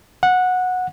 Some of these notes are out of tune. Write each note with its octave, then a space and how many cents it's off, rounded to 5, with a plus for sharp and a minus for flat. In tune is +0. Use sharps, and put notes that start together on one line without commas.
F#5 -15